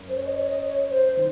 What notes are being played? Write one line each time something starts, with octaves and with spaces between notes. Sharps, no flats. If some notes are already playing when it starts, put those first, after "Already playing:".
Already playing: F#2 C#4
C5
C#5
D#5
C#5
C#5
D#5
C#5
C5
D#3